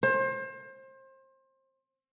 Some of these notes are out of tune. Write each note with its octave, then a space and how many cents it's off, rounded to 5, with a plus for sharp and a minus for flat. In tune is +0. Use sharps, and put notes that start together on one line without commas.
C5 +30